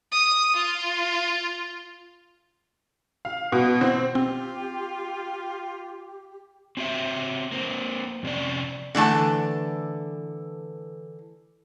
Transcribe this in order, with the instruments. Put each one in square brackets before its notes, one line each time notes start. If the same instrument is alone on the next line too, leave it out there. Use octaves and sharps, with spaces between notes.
[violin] D#6
F4
[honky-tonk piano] F5
B2
C4
[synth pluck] C4 [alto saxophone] F4 [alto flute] G4
[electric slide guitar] C4 F#4 G4 E5
A#3 C4
F2 C3 E3 C#4 D5
[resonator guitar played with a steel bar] D3 E3 A3 A5